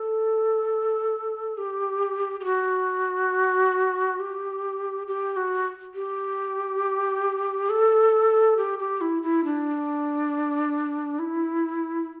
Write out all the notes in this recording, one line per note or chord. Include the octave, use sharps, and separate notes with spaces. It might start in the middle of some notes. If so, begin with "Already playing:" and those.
Already playing: A4
G4
G4
F#4
G4
G4
F#4
G4
A4
G4
G4
E4
E4
D4
E4